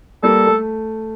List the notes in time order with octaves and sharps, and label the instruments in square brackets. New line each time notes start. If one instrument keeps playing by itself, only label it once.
[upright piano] G3 A#3 [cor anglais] A4
[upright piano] A3